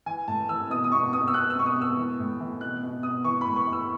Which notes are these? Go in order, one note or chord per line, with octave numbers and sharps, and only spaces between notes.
E3 G#5
A2 A5
E3 E6
B2 D#6
D#6
B2 C#6
B2 D#6
E6
B2 F#6
E6
B2 C#6
D#6
B2 E6
E3
A2
E3
B2 F#6
B2
B2 D#6
E3 C#6
B5
A2
C#6
E3
E6